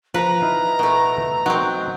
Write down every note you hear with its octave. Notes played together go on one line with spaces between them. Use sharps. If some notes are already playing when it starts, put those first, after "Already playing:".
F3 B4 A#5
D#4 E4 F5
B2 A3
F#3 C4 D#4 F#4